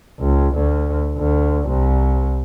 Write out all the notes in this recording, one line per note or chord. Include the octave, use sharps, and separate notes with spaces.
C#2
D2
D2
C2